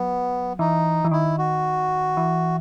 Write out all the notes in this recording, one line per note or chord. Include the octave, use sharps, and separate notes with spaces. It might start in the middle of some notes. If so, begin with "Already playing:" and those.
Already playing: F#3 B3
E3 D#4
E3
D#3 E4
F#4
E3